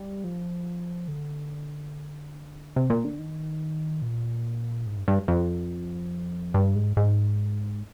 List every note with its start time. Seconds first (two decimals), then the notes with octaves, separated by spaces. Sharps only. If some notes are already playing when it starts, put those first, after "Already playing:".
Already playing: G3
0.24 F3
1.08 D3
2.76 C3
2.90 A#2
3.05 D3
3.19 D#3
4.02 A#2
4.86 G#2
4.97 G2
5.08 G2
5.28 F2
6.54 G2
6.75 G#2
6.97 G#2